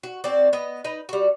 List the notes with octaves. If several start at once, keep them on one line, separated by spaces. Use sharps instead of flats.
F#4
C4 F#4 D5
B3 D#5
D#4 B4
G3 F#4